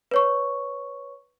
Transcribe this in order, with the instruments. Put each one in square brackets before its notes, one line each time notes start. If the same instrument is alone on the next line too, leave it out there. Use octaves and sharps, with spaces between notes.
[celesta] B4 C#5 C#6